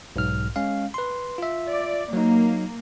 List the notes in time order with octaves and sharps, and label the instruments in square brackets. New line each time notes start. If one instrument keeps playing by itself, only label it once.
[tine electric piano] B1 G#2 F6
G#3 C#4 F5
B4 C6
F4 E5
[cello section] D5
[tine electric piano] F#3 D#4 [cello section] A#3